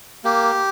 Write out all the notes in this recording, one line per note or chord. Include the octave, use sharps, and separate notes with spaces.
A#3 G4